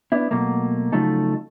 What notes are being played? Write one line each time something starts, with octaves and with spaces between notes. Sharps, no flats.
B3 D4 E4
B2 F#3 A3 A#3
C#3 F3 F#3 A3 D#4 A4